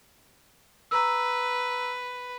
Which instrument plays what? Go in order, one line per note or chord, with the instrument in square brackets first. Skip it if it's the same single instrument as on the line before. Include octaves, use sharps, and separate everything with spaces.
[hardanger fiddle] B4 [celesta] A#5 E6